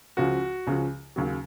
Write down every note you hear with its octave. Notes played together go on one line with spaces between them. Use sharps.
C#2 C#3 F3 F#4
C#2 C#3 F3
D#2 C#3 F#3